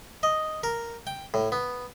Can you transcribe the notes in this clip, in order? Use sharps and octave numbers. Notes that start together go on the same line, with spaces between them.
D#5
A#4
G5
A2
B3